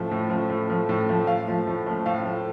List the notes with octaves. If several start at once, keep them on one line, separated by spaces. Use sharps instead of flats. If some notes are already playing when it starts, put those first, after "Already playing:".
Already playing: A2 F3 A3
A2
F3 A3
A2
F3 A3
A2
F3 A3
A2 F5
F3 A3
A2
F3 A3
A2 F5
F3 A3